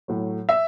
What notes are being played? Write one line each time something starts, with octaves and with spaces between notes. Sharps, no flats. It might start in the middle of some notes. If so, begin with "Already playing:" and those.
A2 F#3
E5